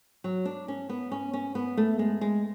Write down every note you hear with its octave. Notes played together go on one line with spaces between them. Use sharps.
F#3
D4
C#4
B3
C#4
C#4
B3
A3
G#3
G#3